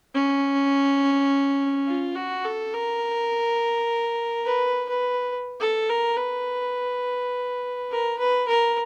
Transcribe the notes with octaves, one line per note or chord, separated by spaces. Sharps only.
C#4
F4
F#4
A4
A#4
B4
B4
A4
A#4
B4
A#4
B4
A#4